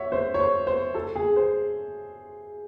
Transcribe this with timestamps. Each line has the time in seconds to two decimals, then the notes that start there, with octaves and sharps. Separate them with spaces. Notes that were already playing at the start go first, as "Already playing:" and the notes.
Already playing: C#5 E5 F#5
0.12 C5
0.34 C#5
0.40 C5
0.67 C5
0.95 A4
1.16 G#4
1.36 C5